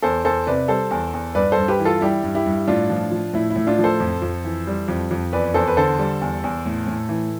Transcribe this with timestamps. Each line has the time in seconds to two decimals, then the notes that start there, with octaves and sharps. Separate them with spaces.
0.02 E2 A4 C5
0.24 E2 A4 C5
0.47 C3 B4 D5
0.68 G3 A4 C5
0.91 E2
1.14 E2
1.35 G2 B4 D5
1.52 G2 A4 C5
1.68 G4 B4
1.79 E3
1.85 F4 A4
2.01 G3 E4 G4
2.23 G2
2.35 E4 G4
2.46 G2
2.68 A2 D4 F4
2.90 F3
3.12 F3
3.34 A2 E4
3.50 E4
3.56 A2
3.67 D4 F4
3.78 F3
3.84 A4 C5
4.00 F2
4.22 F2
4.45 E3
4.67 G3
4.88 F2
5.11 F2
5.33 E2 B4 D5
5.54 E2 A4 C5
5.67 B4
5.77 D3 A4 C5
5.99 G3
6.21 E2
6.44 E2
6.66 A2
6.87 A2
7.09 E3